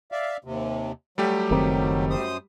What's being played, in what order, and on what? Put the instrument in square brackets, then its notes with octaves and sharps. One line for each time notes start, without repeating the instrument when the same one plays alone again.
[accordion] D5 E5 F5
D#2 C3
[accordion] F#3 [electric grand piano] G3 A3 G4
[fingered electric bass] F#1 D#3 C4
[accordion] F#2 C5 D#6